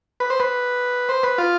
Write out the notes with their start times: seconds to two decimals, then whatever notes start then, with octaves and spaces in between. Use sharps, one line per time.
0.20 B4
0.30 C5
0.40 B4
1.09 C5
1.23 B4
1.38 F4